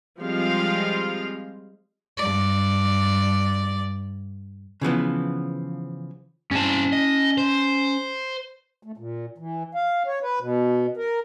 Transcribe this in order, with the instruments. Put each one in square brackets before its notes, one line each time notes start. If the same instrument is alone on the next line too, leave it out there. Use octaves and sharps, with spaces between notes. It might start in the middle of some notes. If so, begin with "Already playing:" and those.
[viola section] F3 G3 G#3 C4 F4 F5
[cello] G2 D5
[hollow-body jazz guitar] C#3 E3 F3 B3
[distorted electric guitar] G2 C4 [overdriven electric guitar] C#4 A5
[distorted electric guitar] D#5
C5
[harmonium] A3
A#2
E3
F5
C#5
B4
B2
A#4